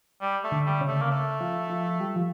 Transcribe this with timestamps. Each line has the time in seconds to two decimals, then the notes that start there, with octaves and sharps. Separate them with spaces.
0.22 G3
0.44 A3
0.52 D3
0.66 G3
0.81 C#3
0.88 A3
1.02 A#3
1.11 A3
1.40 F3
1.70 F3
2.00 G3
2.16 F3